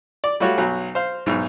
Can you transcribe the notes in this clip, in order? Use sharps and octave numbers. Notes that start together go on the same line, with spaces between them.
D5
G3 A3 F4 F#4 C#5
B1 F#3 G#5
C5 F5
B1 G#2